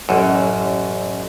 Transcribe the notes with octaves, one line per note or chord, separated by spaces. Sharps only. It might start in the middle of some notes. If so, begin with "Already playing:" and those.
A1 F#2